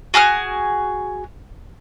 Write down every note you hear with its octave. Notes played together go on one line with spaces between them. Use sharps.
F#4 G#4 D#6 F6